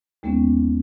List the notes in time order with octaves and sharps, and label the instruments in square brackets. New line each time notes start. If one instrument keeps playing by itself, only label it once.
[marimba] D#2 G#3 A#3 B3 C#4